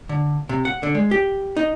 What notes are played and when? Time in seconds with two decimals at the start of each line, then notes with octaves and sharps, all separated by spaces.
0.09 D3
0.49 C3
0.65 F#5
0.83 D3
0.95 G#3
1.11 G4
1.57 D#4